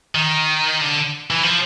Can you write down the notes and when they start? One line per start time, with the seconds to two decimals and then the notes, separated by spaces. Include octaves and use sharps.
0.15 D#3
0.81 D3
1.30 E3
1.43 F3